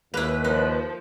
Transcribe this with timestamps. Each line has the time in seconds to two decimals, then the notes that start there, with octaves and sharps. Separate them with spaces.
0.14 D#2 A#3 E4 B4
0.44 F3 D#4